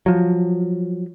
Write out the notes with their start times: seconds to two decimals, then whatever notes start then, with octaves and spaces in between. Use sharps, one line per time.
0.06 F3 F#3